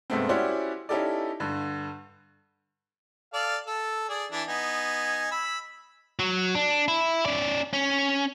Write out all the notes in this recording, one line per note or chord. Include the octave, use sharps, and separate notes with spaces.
G2 C3 G#3 A3 B3 C4
C#4 E4 F#4 G4 C5 D5
C#4 D#4 E4 G4 A4 D5
G2 D3
A4 D5 F5
A4
G#4 D5
E3 D4
B3 D#4 G#5
B5 E6
F#3
D4
E4
C#4 D5
C#4